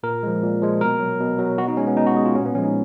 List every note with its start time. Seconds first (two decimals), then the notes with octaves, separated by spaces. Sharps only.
0.03 A#2 A#4
0.23 F3 G#3
0.42 A#2
0.62 F3 G#3
0.81 B2 A#4
1.00 F#3
1.20 B2
1.39 F#3
1.58 B2 F#4
1.68 D#4
1.77 G#3 C#4
1.87 B3
1.97 B2 D#4
2.07 F#4
2.15 G#3 G#4
2.25 F4
2.35 A#2 C#4
2.45 B3
2.55 F3 C#4
2.58 G#3
2.64 D#4